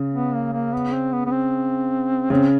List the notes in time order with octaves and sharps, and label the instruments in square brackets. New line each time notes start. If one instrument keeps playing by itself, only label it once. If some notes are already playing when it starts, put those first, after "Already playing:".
Already playing: [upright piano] C#3
[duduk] B3
A#3
A#3
B3
C4
B3
B3
C4
[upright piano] C#3 [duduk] C4